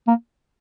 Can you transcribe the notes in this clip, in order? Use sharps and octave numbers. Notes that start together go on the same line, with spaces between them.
A#3